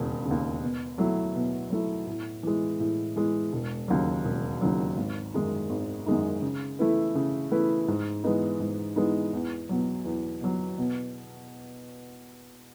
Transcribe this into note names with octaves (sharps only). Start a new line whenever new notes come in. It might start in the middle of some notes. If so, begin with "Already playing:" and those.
Already playing: E1 D#2 C#3
C#3
D#2
B2
F#3 A3 E4
B2
F#3 A3 E4
A2
E3 G#3
A2
E3 G#3
E1
D#2 C#3 F#3
E1
D#2 C#3 F#3
G#1
F#2 D#3 G#3 D#4
G#1
F#2 D#3 G#3 D#4
C#3
E3 A3 E4 B4
C#3
E3 A3 E4 B4
G#2
E3 G#3 B3 D#4
G#2
E3 G#3 B3 D#4
E2
B2 F#3
E2
B2 F#3
B2